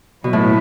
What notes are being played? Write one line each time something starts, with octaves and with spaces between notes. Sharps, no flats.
B2 F#3 B3 E4 B4
A2